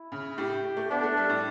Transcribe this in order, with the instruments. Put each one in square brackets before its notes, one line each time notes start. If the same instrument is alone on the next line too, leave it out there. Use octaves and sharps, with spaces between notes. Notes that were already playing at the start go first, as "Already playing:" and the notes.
Already playing: [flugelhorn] E4
[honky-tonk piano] C#3
[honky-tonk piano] A2 [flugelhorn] G4
[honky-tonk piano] A3
[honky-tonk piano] B3 [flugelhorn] D4
[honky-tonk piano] A3
G3
A2